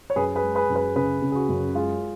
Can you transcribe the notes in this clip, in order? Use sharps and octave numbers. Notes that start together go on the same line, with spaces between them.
C#5
F#2 G#4 B4
G#4 B4
G#3
G#4 B4
F#2
G#4 B4
C#3 G#4 B4
C#3
G#4
F#4
F#2
G#3 F4 G#4